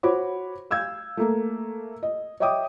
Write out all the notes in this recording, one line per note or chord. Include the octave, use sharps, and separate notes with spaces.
F#4 C5 C#5 B5 D6
F5 E6 G6 G#6
A3 A#3
D#5
C#5 D#5 E5 G5 D6 D#6